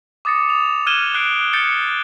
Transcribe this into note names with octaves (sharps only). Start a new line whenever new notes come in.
D6 D#6 A6 A#6 C#7
D#6 F7
F6 F#6 G#6 D#7 E7 G7
F#6 C7 D7
G6 A6 C#7 G7